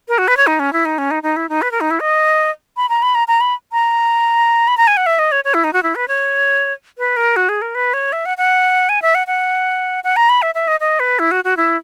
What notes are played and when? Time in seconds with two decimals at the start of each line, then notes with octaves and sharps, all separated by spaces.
0.08 A#4
0.18 F#4
0.28 B4
0.37 C#5
0.47 D#4
0.60 C#4
0.73 E4
0.85 D#4
0.98 C#4
1.11 D#4
1.23 D#4
1.36 E4
1.49 D#4
1.62 B4
1.71 A#4
1.81 D#4
1.91 E4
2.00 D#5
2.77 B5
2.89 A#5
3.02 B5
3.15 A#5
3.28 A#5
3.41 B5
3.72 A#5
4.68 B5
4.77 A#5
4.87 G#5
4.97 F#5
5.06 E5
5.19 D#5
5.32 C#5
5.44 C#5
5.54 E4
5.64 D#4
5.73 F#4
5.83 E4
5.95 B4
6.08 C#5
6.98 B4
7.17 A#4
7.36 F#4
7.49 G#4
7.62 A#4
7.75 B4
7.94 C#5
8.13 E5
8.26 F#5
8.38 F#5
8.89 G#5
9.02 E5
9.15 F#5
9.27 F#5
10.04 F#5
10.16 A#5
10.29 B5
10.42 E5
10.55 E5
10.68 D#5
10.80 D#5
11.00 B4
11.19 E4
11.31 F#4
11.44 F#4
11.57 E4